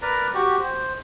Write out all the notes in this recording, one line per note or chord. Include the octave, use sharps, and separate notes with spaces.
A#4 B4 D5 A#5
F#4 G4
C5